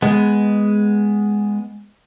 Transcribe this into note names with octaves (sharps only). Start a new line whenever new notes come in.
G#3 B3